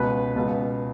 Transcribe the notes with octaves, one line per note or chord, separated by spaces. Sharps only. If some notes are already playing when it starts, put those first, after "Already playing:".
Already playing: C#2 B2 B4
C#2 B2